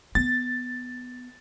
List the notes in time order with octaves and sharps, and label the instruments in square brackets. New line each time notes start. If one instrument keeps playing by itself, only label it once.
[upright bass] B3 [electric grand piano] A6